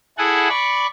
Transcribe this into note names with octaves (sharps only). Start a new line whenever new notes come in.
E4 G#4 A4 F#5 G#5
D5 B5 C#6